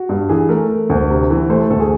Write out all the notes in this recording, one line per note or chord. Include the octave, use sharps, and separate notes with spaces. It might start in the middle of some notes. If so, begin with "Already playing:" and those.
Already playing: F#4
G2
E3 G#4
A3 A#4
A3
D2
C3
E3
A3 C5
A4
D2 A4
G#4